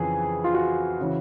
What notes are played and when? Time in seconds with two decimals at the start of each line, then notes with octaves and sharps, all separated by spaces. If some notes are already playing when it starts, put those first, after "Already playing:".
Already playing: F2 C#3 E3 G#4
0.44 F4
0.54 F#4
1.01 C#3 E3